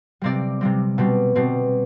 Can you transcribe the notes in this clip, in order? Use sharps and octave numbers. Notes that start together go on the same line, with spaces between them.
C3 G3 C4 D5
C3 G3 C4
B2 G3 C4
B2 G3 C4